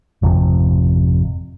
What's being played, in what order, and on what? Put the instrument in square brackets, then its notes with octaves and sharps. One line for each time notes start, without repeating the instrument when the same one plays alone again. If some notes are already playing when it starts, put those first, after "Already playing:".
[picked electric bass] G#1 F2 C3